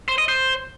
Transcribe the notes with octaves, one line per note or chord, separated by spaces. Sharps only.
C5
D#5
C5